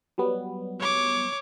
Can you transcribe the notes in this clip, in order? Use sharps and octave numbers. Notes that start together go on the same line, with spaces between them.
F#3 G3 B3
C#5 D6